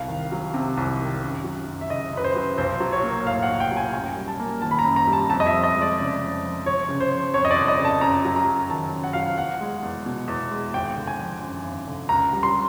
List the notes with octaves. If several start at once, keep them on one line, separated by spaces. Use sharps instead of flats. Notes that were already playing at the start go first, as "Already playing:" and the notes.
Already playing: C2 F5
D#3
F#3
C3
C2
D#3
F#2
F#3
F#2
E5
C#3 D#5
F#2 B4
C5
F#3
B1 C5
F#3
C#5
A#3
A2 F5
F#5
B1
G5
F#3
G#5
F#2 G#5
G3
A5
A#3
D#3 A5
B5
A#5
F#2
A#5
G3
A5
F2 A5
D#5
E5
F3
D#5
G#3
D5
C#3 D5
F2
F3
G1 C#5
C#3
C5
F3
F2 C#5
D#5
D5
G1
D#5
C#3
A5
F#2 A#5
F#3
A#5
F#2
D#3 A5
F#2
F#5
F#3 F5
F#5
E2 F#5
G#3
E2
B2
E2
G#3
G#1 G5
D3
G#5
F3
F#2
G#1
D3
C#2 A#5
G3
C6